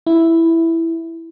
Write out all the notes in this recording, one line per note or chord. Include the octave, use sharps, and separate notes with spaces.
E4